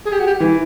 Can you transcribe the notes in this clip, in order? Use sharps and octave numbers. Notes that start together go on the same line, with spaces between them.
G#4
G4
F#4
G4
E3